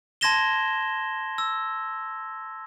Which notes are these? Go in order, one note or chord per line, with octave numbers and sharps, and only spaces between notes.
A5 C6 G#6 A#6 E7 G7
E6